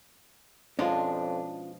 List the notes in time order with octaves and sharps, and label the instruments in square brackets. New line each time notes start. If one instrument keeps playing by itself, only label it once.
[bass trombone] F2 [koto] B2 F3 G#3 [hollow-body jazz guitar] C#4 F4 [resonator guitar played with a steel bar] D4